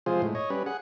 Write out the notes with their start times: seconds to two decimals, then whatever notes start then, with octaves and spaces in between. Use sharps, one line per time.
0.06 C3 F3 G#3 F4 G#4 C5
0.22 A2 G#3
0.35 C#5 D#5
0.50 G3 C#4 B4
0.66 G#4 F#5